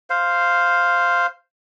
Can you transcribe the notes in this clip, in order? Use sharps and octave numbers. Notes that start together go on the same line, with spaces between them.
C5 F5